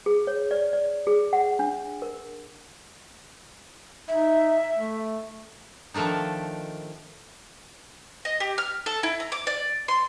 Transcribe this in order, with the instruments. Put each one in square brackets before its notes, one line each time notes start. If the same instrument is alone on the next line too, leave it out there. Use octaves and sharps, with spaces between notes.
[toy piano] G#4
C#5
D5
D5
G#4
F#5
D4
A#4
[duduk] D#4 [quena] E5
[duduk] A3
[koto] D#3 F3 A3 D4 D#4
[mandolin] D#5
G4
F6
A4
E4
A#5
D6
D5
C6